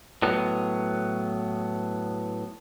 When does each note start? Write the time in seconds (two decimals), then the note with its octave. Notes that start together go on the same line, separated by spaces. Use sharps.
0.22 A2 F#3 B3